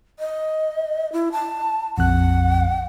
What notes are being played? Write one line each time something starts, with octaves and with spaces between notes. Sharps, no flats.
D#5
E4
A5
A#1 F2 F#5 F#6